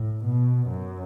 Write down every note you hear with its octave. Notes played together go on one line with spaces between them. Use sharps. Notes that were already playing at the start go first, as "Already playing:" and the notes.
Already playing: A2
B2
F#2